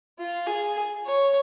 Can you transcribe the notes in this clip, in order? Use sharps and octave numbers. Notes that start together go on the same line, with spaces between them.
F4
G#4
C#5